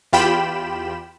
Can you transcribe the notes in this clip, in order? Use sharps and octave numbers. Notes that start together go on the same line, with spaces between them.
E2 F4 G4 G5 B5 E7